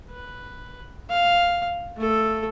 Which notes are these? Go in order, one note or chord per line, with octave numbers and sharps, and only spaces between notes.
B4
F5
A3 A4